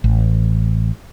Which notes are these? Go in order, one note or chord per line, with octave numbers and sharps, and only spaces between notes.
A1